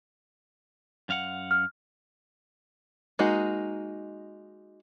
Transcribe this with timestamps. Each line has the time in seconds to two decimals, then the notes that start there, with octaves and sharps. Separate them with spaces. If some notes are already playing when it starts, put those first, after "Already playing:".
1.09 F#2 F5 F#5
1.51 F6
3.19 G#3 A#3 D#4 F#4